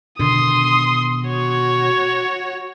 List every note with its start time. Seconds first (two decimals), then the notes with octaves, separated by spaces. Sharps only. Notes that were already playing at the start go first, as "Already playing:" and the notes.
0.19 B2 D3 D#3 C6 D#6
1.26 F#4 C#5